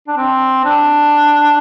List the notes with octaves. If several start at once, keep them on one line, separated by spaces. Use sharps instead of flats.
D4
C4
D4